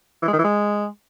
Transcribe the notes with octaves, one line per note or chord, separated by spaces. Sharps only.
E3
G#3
D#3
E3
G#3